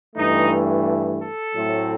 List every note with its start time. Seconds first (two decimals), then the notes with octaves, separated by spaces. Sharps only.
0.16 G2 E3 A3 D#4
1.21 A4
1.55 A2 F#3 A3 C4